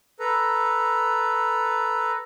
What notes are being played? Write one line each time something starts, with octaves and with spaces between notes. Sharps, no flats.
A4 B4 A#5